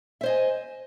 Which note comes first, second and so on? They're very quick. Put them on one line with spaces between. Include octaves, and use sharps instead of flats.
E5 C5 D#5 G#5